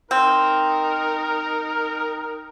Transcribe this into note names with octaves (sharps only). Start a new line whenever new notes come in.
C4 D#4 A#4